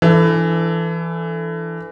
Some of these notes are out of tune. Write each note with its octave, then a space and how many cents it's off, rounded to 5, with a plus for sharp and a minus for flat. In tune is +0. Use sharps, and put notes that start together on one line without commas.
E3 +20 D4 +0 A4 +0